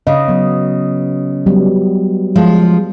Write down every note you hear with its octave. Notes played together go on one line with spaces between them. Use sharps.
C#3 D#5
F#3 B3
F#3 G3 B3
F3 G#3